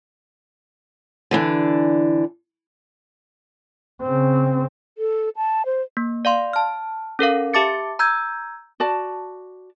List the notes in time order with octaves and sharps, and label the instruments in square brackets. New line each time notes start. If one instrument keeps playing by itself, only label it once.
[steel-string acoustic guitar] D3 E3 D4
[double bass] C#3 C4
[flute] A4
A5
C5
[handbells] A#3
D5 F5 C6
A5 F6
C#4 A4 A#4 F5
G4 E5 A5 D6 A6 C#7
A#5 E6 G6 G#6
[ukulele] F#4 D5 A5